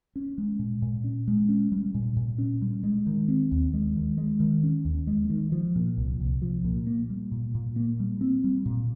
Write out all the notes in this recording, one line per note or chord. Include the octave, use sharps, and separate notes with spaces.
C#4
G#3
A#2
A#2
C#4
G#3
C#4
G3
A#2
A#2
C#4
G3
G#3
D#3
C4
D#2
G#3
D#3
G#3
D#3
C#4
D#2
G#3
D#3
F3
A#2
C2
C2
F3
A#2
A#3
G3
A#2
A#2
A#3
G3
C4
G3
A#2